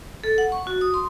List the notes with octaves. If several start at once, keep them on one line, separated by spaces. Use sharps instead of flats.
A4
F#5
C#6
F#4
D#6
C6